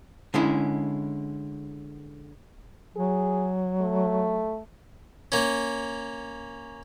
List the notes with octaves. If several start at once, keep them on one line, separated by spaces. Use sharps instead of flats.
D3 G#3 C#4 E4
F#3 G#4
A3
A#3 C#4